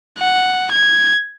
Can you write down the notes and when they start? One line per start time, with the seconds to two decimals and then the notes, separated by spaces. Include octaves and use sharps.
0.18 F#5
0.71 G#6